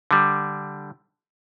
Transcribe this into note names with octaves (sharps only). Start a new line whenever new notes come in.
D3 G3